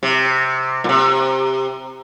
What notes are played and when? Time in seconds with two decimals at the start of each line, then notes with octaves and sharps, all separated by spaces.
0.03 C3
0.84 A#2
0.89 C3